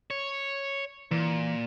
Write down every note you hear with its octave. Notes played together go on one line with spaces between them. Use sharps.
C#5
A#2 E3